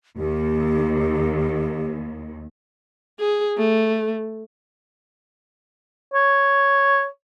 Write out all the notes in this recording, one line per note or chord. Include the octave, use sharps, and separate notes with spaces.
D#2 G4
G#4
A3
C#5